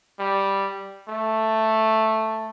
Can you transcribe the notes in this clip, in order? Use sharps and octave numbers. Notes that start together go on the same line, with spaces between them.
G3
A3